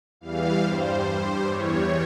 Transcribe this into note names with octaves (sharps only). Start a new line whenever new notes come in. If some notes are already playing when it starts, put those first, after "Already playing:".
E2 E3 G3 F5
G2 G3 C5
G2 G3 C5
E2 E3 G3 C#5